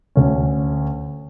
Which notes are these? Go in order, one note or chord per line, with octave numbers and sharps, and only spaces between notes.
D2 C#4